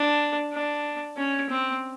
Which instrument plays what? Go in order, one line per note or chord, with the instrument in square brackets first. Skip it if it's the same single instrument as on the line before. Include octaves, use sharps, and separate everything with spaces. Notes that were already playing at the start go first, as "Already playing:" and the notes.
Already playing: [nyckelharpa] D4
D4
C#4
C4